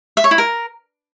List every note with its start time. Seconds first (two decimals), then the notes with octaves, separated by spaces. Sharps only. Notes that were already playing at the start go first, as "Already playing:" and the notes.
0.17 E5
0.24 C#5
0.31 E4
0.38 A#4